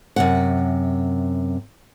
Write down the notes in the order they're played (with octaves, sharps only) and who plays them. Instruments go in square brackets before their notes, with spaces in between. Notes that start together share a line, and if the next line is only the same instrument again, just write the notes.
[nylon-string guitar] F#2 C3 F#5